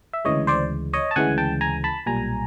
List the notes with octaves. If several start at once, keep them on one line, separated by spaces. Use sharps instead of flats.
E5
D2 C#3 E3 G#3 C#5 D#5
C5 D5
C#5 D#5
A5
D2 C#3 E3 G#3 F#5 G#5
G5 A5
G#5 A#5
A5 B5
B1 A#2 G3 G#5 A#5